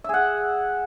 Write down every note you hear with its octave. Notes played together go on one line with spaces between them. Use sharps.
G#4 E5 F#5